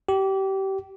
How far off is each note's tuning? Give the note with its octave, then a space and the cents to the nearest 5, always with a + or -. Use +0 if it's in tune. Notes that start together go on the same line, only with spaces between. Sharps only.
G4 -25